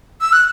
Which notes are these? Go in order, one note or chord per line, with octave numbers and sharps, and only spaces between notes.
E6
F#6